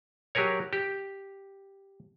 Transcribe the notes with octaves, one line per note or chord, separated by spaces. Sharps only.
F#3 G4 G#4 A#4 C#5
G4